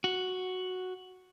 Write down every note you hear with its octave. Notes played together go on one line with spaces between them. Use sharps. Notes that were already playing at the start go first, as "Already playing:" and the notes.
F#4